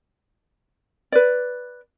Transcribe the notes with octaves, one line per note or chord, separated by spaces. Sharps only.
B4 D5